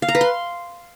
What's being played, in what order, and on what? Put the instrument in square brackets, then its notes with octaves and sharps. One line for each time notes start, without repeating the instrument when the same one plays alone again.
[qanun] F5
A#5
B4
C6